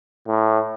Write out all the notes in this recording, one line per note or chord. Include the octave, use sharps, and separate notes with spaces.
A2